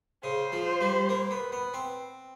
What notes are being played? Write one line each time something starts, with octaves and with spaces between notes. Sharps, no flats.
C#3 C5
F3
G3
A#3
B3
B3
C4